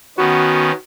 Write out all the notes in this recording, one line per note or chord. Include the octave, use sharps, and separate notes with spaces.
D#3 B3 C#4 F#4